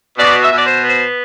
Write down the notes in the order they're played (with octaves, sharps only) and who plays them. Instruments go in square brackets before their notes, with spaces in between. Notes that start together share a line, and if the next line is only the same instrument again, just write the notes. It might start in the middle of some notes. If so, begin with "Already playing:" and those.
[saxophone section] B2 D5
E5
B2
D5
C5
B3
C5